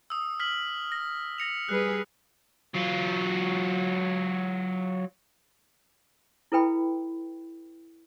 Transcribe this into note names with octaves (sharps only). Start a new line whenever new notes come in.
D#6 E6
F6 B6 F#7
A#6
A#6 C#7 F7
G3 G#4 B4 F#6
F#3 F4
E4 A4 B4 G5 B5